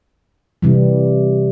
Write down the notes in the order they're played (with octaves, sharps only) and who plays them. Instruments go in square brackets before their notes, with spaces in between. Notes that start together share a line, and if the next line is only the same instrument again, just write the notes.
[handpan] C3 E3 G3